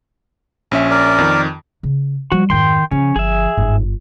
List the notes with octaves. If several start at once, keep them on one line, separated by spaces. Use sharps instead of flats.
A#1 C#4 E5
A#4 D5
F2 D#3
C#3
F3 G3 G#3 F#4
F2 G#2 D#3 G5 C6
C#3 F3 C#4
G1 G#4 E5
G1 G#2 F4